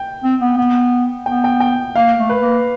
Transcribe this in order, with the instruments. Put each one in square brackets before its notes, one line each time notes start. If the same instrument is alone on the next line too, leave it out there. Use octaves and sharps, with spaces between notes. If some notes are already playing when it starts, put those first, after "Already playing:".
Already playing: [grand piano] G5
[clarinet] C4
B3
B3
[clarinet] B3 [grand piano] G5
[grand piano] G5
G5
[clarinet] A#3 [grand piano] F5
[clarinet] A3
[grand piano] B4
[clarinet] A#3